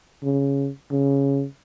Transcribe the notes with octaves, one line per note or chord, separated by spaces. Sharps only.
C#3
C#3